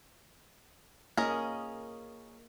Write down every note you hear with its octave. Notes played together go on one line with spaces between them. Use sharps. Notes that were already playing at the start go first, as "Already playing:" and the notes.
A#3 C#4 G#4 A#4 D#5